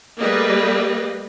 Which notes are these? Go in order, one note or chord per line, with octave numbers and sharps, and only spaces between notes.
G3 A3 A#3 G#4 B4 D#5